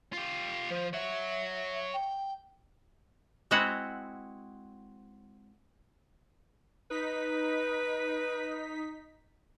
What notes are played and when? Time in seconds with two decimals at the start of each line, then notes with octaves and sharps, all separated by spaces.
0.13 F4 G4
0.70 F3 C5
0.93 C#5 E5 F#5
1.94 G5
3.51 G#3 C4 E4 F#4 F#5
6.91 D#4 B4 B6